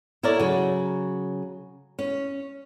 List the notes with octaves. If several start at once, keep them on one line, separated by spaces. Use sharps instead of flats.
E4 A4 A#4 C#5 D5
C#3 F#3
C#4